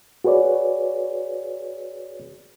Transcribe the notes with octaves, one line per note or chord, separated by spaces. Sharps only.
F#4 G#4 B4 C#5 D5